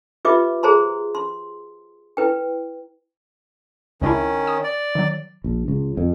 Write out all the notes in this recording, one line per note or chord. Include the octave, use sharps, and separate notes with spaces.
F4 G4 B4 D#5 E5 D6
G#4 C5 A#5 C6
C6
E4 B4 G5
C#2 D#3 C#4 D4 E4
D#6
D5
D#3 F#3
A#1
C#2
F2